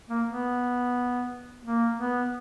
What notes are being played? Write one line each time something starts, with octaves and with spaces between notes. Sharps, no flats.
A#3
B3
A#3
B3